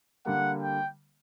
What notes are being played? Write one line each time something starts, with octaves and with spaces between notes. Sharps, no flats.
D3 G3 A#3 F#5
G5